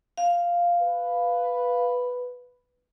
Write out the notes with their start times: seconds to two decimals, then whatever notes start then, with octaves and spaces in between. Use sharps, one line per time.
0.17 F5
0.82 B4